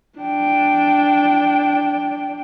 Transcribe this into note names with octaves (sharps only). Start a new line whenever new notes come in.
D4 G5